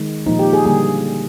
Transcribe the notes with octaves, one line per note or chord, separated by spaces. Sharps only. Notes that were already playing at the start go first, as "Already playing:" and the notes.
Already playing: D#3 G#3
A#2 F3 A#3 D#4
G4
G#4
D3 G3 A#3 G#4